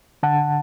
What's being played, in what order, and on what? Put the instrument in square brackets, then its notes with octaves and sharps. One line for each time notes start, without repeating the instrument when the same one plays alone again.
[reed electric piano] D3 F#5 A5